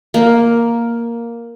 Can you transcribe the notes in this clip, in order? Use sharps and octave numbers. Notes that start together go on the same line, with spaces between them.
A#3